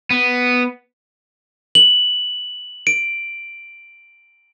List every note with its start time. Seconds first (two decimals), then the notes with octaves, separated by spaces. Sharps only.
0.10 B3
1.75 F#7
2.87 D7